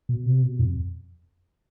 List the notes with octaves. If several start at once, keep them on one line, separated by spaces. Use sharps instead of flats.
B2
C3
B2
F2